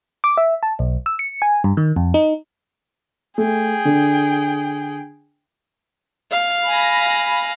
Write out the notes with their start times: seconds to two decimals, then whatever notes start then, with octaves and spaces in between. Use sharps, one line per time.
0.24 D6
0.38 E5
0.63 A5
0.79 B1
1.06 E6
1.19 C#7
1.42 G#5
1.64 G2
1.77 D#3
1.96 F2
2.14 D#4
3.38 A3 G#4 G5
3.85 D3
6.31 F5
6.66 G#5 B5 A#6